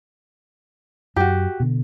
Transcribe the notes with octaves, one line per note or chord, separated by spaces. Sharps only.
F#2 F#4 G4
B2 D3